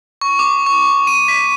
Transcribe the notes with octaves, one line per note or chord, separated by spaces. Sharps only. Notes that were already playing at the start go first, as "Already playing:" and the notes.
C#6
D6
C#6
D#7
B6